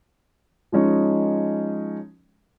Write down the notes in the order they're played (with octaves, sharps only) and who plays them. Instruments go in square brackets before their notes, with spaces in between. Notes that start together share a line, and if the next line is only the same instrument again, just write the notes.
[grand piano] F3 G#3 C#4 D#4